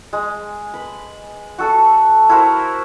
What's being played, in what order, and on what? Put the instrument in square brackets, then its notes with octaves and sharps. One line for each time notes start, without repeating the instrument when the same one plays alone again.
[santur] G#3
B4
F#4 A4 A5
E4 F#4 A#4 C5